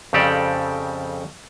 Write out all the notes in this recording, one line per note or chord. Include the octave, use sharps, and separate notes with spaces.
F2 C#3 C4 G4 A4 D5